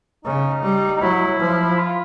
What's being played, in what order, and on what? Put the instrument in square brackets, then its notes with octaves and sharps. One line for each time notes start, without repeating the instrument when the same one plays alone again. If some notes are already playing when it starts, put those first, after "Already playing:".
[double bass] C#3 [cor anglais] D#4
[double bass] G3
[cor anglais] D#4
[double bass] F#3 [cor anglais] E4
[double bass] F3
[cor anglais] F4